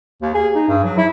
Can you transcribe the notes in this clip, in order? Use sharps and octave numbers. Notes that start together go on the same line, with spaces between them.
D#2
G#4
D#4
G2
F#3
E4